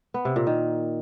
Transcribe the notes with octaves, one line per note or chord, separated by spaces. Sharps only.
B3
C3
A#2
D#3